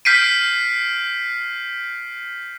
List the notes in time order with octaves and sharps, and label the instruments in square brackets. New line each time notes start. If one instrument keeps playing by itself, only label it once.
[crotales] F6 G6 B6 C7 D7 D#7